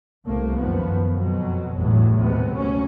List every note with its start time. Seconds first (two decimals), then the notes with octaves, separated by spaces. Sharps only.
0.25 C2 A3 A#3
0.56 F#2 D#3 F3 B3
1.12 F2 B2 F#3
1.76 G1 E2 A2 F#3
2.20 D#2 C3 G#3 B3
2.53 D2 F#3 C#4